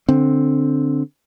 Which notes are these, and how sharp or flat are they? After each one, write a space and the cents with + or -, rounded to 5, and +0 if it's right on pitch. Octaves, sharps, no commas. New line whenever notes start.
D3 +0 C4 +0